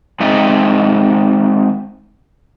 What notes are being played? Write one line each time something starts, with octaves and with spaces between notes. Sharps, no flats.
G#3 C4 D#4 E5 G#5